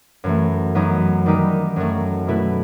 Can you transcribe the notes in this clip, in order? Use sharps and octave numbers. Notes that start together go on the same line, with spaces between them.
F#2 E3 A3
F#2 F#3 B3 D#4
D#3 G3 B3 D#4 G4
F#2 F#3 A3
B2 A3 E4 B4